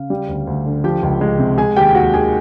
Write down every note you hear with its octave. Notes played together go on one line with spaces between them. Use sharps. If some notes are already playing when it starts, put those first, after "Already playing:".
Already playing: C#3 F5
G3
D2
D2
D3
F3 G4 G5
C#2
G#3
C3
G#3 G#4 G#5
D#2 G4 G5
D#2 F#4 F#5
D#3 G#4 G#5